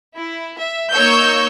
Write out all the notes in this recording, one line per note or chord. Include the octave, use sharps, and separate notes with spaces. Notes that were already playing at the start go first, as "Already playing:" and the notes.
E4
E5
A#3 D#4 C#5 C#6 E6 G6